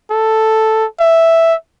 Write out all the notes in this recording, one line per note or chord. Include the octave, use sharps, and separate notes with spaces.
A4
E5